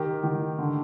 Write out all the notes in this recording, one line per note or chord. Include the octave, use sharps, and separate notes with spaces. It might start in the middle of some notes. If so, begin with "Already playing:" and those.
Already playing: D#3 G4 A#4
D#3
D3